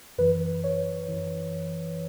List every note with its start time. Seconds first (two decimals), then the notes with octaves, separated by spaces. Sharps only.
0.18 F#2 E3 B4
0.64 C#5
1.08 F#2 E3